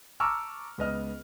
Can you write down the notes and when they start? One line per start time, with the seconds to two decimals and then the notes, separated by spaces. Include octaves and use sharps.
0.20 A5 A#5 C#6 D6 E6 F6
0.78 C#2 B3 D#5 F6